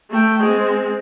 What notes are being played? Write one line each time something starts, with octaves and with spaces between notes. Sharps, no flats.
A3 G5
G#3 C4